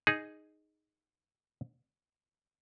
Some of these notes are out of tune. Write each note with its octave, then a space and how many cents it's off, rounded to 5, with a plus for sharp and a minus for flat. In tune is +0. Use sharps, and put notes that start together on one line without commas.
D#4 +0 G#4 +0